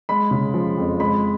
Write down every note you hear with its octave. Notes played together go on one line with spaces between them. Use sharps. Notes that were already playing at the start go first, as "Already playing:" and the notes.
G#3 B5
C#3
F3
F2
G#3 B5